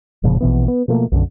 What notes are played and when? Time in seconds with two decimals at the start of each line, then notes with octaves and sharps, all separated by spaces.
0.23 E1 A#2 C#3 F3
0.41 A#1 B2 E3 B3
0.68 B3
0.88 B2 F3 A3 A#3
1.12 B1 F#2 D3